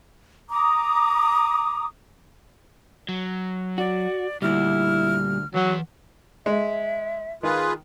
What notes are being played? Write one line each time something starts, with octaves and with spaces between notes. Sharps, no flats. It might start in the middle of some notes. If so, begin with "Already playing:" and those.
A#5 D6 D#6
F#3
F#4 D5
D2 A#2 G3 E4 F6
E3 F#3 F#5
G#3 E5
D#3 F4 G#4 B4